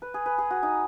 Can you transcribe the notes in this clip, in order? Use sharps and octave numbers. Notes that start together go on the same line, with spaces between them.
B4
G#4
B4
G#4
F#4
D#4